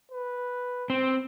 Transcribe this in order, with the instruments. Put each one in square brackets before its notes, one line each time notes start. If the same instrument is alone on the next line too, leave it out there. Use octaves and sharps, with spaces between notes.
[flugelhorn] B4
[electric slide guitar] C4